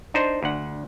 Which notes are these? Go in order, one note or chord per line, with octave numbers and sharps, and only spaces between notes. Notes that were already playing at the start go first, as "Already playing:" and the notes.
D4 D#4 C5
D2 F#5